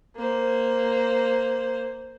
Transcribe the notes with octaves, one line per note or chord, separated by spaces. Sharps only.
A#3 C5